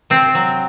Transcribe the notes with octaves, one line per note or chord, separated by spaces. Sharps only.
C3 C4
F#3